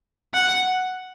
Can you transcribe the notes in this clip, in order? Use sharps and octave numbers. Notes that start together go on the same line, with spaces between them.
F#5